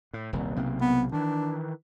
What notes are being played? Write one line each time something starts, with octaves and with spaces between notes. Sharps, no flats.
A2
D#1 C2
B1 C3 A#3
B3
D#3 E3 D4